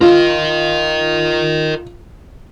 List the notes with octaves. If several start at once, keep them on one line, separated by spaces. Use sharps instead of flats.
F4 A#4 D#5